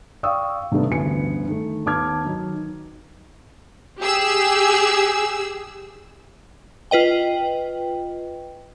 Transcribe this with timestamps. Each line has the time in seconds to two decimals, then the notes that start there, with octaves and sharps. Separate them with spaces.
0.23 D5 F5 G5 C#6 D#6 E6
0.72 C3 D#3 G3 A3 B3 D4
0.90 A1 D2 G2 B3 G#5 C#7
1.46 D#3 A3
1.86 D#2 B3 A5 D6 F6 G#6
2.25 D#3 F#3 D#4
4.00 G4 G#4 E6
6.91 F4 B4 D#5 G5